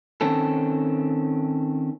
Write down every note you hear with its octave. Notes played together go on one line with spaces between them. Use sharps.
D#3 C4 C#4 A4